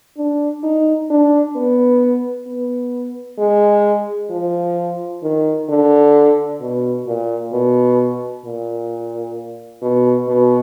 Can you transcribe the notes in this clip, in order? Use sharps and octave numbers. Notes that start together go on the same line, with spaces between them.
D4
D#4
D4
B3
B3
G#3
F3
D#3
D3
B2
A#2
B2
A#2
B2
B2